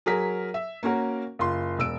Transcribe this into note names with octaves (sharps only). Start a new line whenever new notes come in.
F#3 G#4 A#4 B6
E5
A#3 C#4 F#4 A#4
F#1 F4 C6
E1 E6 D7